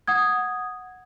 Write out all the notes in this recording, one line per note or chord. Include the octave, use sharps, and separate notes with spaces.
F#5 D#6 G#6